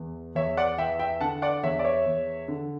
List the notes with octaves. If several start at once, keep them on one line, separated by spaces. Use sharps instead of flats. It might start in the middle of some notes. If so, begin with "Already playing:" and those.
Already playing: E2
E2 C#5 E5
D5 F#5
E3 E5 G5
E5 G5
D3 F#5 A5
D5 F#5
E2 C#5 E5
D5
C#5 E5
E2
D3